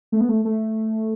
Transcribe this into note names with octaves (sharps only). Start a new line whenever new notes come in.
A3
B3
A3
A3